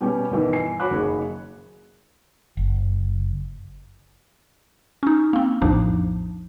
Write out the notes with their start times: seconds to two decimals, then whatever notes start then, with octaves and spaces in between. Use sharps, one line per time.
0.01 B2 G3 B3 C#4 G4
0.31 G1 B2 D#3 E3
0.53 G#5 C7
0.80 F#4 C#5 B5 D6 F#6
0.91 F#1 D#3 G#4
2.57 F#1
5.03 C#4 D#4
5.33 A#3 C4
5.62 A#1 F2 A2 F3 D4 D#4